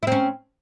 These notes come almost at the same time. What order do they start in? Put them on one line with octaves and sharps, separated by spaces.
E4 C4 C#4